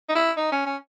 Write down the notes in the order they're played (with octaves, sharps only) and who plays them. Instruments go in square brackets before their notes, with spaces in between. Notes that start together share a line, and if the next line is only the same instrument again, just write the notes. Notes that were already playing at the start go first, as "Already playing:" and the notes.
[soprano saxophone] D#4
E4
D#4
C#4
C#4